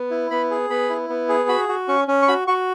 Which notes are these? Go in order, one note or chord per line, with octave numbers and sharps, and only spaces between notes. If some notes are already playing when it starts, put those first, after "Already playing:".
Already playing: B3
E4
B3 B5
G#4
B3 B5
E4
B3
G#4
F#4 B5
F#4
C#4 C#6
C#4
C#6
F#4 B5
F#4 C#6